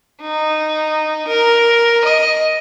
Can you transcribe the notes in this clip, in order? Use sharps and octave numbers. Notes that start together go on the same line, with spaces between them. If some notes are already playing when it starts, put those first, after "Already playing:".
D#4
A#4
D#5